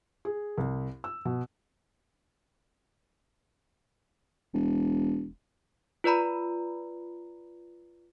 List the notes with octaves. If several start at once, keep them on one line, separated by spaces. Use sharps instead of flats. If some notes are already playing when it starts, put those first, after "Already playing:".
G#4
C2
E6
B2
E1
F4 B4 D5 A#5 B5